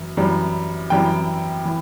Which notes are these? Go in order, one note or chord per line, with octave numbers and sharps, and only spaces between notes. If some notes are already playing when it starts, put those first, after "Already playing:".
Already playing: F#2 E3
F#2 E3 G3
F#2 E3 G3 G5
E3